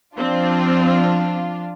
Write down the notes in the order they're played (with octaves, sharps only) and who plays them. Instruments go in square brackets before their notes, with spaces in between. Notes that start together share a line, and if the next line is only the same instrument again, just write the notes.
[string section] F3 D4 F4 [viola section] C4